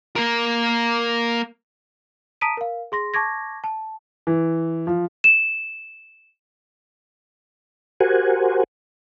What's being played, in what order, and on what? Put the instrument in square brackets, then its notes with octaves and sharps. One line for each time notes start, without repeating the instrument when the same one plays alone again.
[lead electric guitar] A#3 A#4
[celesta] A5 A#5 D#6 B6 D7 D#7
A#4 F5
G#4 C6 A#6
A5 C#6 D6 G#6 A#6
A5
[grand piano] E3
F3
[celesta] E7
[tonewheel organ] F#4 G4 A#4 C5 F#5 G#5